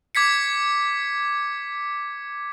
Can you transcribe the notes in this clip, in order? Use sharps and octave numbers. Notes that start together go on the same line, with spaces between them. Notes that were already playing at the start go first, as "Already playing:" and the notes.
D6 G#6 B6 C#7